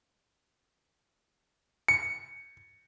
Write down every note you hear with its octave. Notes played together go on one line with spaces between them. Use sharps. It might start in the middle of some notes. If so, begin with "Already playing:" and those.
C#7